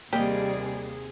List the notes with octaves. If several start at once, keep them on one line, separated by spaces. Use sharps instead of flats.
D#2 C3 G3 A#3 G4 G#4 D5 D#5